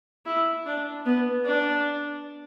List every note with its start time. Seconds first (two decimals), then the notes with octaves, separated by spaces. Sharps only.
0.26 E4
0.66 D4
1.05 B3
1.45 D4